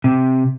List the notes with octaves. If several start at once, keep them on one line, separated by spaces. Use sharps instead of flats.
C3